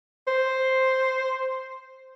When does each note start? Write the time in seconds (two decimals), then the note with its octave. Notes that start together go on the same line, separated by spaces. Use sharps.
0.27 C5